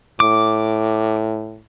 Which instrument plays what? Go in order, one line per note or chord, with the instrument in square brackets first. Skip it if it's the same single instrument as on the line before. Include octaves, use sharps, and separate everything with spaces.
[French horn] A2 [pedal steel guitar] D6